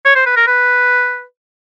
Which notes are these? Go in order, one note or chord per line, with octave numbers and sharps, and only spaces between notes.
C#5
C5
B4
A#4
B4